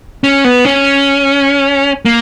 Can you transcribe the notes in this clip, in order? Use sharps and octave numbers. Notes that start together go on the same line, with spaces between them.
C#4
B3
C#4
A#3